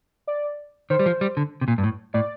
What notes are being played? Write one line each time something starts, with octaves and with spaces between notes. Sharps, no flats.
D5
D#3 C5
G3
F3
G3
D3
C3
A#2
G2
A2
A2 D5